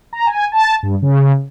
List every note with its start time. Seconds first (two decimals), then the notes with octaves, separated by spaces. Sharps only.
0.13 A#5
0.27 G#5
0.52 A5
0.83 G2
1.02 C#3